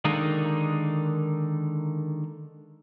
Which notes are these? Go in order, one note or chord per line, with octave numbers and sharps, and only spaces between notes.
D3 D#3 G#3 A#3 D4 D#4